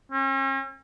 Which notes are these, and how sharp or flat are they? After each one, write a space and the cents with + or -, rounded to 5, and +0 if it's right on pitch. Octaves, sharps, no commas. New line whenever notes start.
C#4 -45